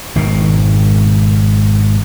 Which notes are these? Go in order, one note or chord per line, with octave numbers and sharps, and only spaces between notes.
G#1 B2 D#3